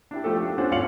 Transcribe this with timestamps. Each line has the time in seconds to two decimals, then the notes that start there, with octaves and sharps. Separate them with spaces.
0.11 D4 E4 G4
0.24 F3 A3 G4 A4
0.42 D4
0.58 C#4 D4 F4 C5 F#5 G#5
0.71 G#1 F4 C#5 F5 C#7 F#7